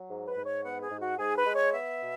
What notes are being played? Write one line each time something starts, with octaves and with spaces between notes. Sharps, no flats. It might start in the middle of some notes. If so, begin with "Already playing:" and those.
Already playing: F#3
G#2
B4
G#2
C#5
B3 F#5
G#4
G#2
F#4
G#2 G#4
B4
G#3
C#5
B3 E5
B2